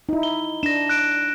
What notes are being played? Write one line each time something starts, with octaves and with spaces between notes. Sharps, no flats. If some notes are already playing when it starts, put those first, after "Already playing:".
D#4 E4
G7
D4 A#6 E7
F#6 D7 E7